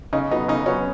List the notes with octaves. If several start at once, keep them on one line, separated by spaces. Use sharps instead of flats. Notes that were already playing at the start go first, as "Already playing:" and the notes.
C#3 D#4
F#3 B3 D#4
C#3 D#4
F#3 B3 C#4